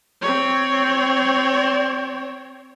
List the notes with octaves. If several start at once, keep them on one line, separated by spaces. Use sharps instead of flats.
C4 C#5